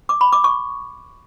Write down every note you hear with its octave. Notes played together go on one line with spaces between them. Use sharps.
D6
B5
D6
C#6